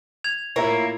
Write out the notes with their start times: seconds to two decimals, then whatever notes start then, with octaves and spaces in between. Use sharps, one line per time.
0.24 G#6 F7
0.56 A2 A#3 E4 F4 C#5 E5